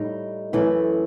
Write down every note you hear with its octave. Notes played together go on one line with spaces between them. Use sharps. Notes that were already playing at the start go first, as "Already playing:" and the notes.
Already playing: A2 G3 D#4
F#2 E3 A3 E4 A4